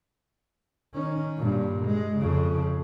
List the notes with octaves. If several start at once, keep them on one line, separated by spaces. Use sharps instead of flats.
D#3 C#4
G2 A#2
G#3
F2 C#3